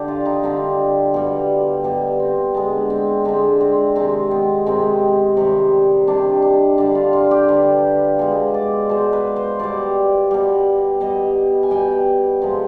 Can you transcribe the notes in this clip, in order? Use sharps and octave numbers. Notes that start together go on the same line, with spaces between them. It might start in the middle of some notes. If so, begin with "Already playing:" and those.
Already playing: D3 G4
F4
D#4
D3 G3 C4
B2 G3
B2 G3
C4
D3 G#3 B3
C4
D3 G#3 C4
C4
C3 D#3 G#3 C4
B3
C3 D#3 G#3 C4
C3 D#3 G3
C3 D#3 G3 D4
D4
D3 G3 D4
F4
F4
G4
D3 G3 B4
B2 G#3
D5
B2 G#3 C5
B4
C5
B2 G3 D5
B2 G3
B2 G3 D#5
G#5
B2 G3 G5
C3 F3 G#3